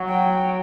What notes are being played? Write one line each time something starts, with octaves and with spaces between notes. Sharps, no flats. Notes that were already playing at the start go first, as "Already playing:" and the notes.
Already playing: F#3
G5